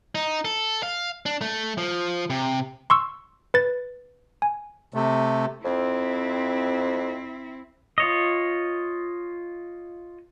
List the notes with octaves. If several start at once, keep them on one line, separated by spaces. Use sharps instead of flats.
D#4
A4
F5
D4
A3
F3
C3
C6 C#6 E6
B4 A6
G#5
C3 A3
F2 C4 E4
F4 C#5 D#5